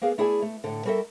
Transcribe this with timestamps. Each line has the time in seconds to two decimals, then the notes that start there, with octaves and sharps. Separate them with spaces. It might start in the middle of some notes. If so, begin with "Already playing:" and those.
0.02 A#3 B3 G#4 F5
0.18 A3 E4 G#4 D5 G5 G#5
0.42 A3
0.64 A2 D3
0.85 G3 F#4 A4 A#4 E5